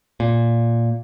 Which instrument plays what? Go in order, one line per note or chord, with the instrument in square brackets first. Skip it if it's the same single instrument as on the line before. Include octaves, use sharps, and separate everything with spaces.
[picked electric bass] A#2